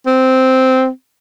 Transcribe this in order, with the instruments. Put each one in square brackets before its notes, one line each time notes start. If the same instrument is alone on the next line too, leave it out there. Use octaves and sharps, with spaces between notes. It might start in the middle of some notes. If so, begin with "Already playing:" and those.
[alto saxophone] C4